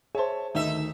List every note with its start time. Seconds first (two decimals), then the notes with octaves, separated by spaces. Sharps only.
0.15 G#4 C5 C#5 E5 A5
0.55 D2 D#3 D#4 E5